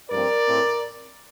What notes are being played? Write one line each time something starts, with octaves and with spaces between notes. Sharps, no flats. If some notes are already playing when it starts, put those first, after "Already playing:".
G2 F3 A3 C4 A#4 D5
A2 A3 C4